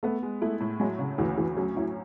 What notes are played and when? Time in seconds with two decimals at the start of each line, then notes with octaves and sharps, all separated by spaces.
0.03 A3 B3
0.23 G#3
0.42 A3 E4
0.60 A2
0.80 F#3 G#3
0.99 C#3
1.18 D2 E3
1.37 D2 E3
1.57 F#3 C#4
1.76 F#3 E4